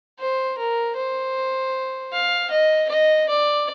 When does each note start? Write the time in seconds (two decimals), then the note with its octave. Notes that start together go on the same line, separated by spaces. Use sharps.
0.19 C5
0.58 A#4
0.97 C5
2.13 F5
2.51 D#5
2.89 D#5
3.29 D5